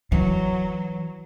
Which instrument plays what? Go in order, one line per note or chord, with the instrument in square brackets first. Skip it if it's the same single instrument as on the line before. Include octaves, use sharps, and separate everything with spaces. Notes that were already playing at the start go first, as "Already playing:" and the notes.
[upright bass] E3 [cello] F#3